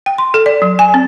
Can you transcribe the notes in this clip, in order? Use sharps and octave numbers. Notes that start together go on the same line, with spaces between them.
G5
C6
A4
D5
F#3
G#5
C4